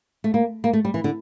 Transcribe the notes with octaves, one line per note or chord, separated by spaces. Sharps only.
A3
A#3
A#3
A3
G3
E3
D3